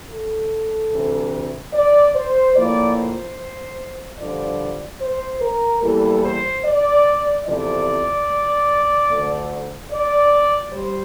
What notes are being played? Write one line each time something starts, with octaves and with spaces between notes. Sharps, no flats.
A4
D2 C3 E3
D5
C5
A2 F3 A#3 D5
C5
G2 D3 F3 D5
C5
A#4
E2 E3 G3 A#3 A4
C5
D5
E2 C3 F3 A3 D5
D2 D3 A3
D5
G3 C5